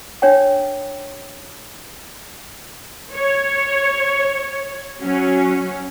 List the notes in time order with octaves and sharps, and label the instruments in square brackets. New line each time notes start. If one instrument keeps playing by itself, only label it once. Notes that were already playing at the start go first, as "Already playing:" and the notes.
[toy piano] D4 C#5 G5
[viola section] C#5
F#3 C#4